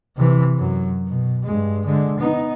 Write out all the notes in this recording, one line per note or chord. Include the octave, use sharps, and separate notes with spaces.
C3 E3
F#2 F#3
B2
G2 G#3
D3 G#3
B3 D#4